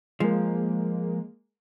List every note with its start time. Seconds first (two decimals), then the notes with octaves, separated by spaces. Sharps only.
0.20 F3 G#3 A#3